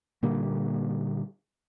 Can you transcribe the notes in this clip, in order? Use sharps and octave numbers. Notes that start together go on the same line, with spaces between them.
A#2 D3 G3 A#3